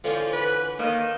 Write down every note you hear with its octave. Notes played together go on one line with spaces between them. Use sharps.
D3 E3 F3 C#4
B4
D#3 A#3